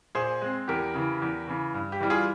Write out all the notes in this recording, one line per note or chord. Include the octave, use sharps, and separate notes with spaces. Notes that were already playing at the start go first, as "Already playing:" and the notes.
A#2 G#4 C5
G#3 C4
E2 G4 A#4
C#3 E3
E2
C#3 E3
G2
G4
E3 G3
F4 G#4